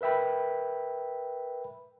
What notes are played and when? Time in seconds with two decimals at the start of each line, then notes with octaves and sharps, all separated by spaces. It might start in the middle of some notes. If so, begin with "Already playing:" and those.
0.01 A#4 B4 E5 G5 B5